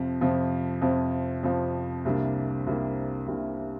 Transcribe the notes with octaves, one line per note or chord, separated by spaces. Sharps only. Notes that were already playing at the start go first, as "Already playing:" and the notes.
Already playing: F2 C3 F3
F2 C3 F3
F2 C3 F3
F2 C3 F3
C2 C3 G3 A#3 D4
C2 C3 G3 A#3 D4
C2 C3 G3 A#3 D4